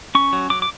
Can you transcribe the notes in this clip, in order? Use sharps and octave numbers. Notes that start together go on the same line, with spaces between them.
C#4 C#6
F#3
F#3 D6
D6